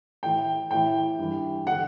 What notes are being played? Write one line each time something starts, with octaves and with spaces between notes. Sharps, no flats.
A2 E3 G5
A2 E3 G5
G2 E3
D3 F#5